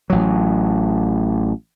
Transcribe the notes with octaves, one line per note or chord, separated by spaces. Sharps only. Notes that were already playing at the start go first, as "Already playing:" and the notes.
A1 F#3